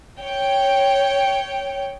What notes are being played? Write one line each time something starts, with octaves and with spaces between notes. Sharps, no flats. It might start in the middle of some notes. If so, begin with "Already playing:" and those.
C#5 G5